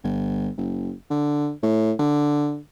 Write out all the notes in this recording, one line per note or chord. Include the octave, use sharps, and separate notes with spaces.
G1
F#1
D3
A2
D3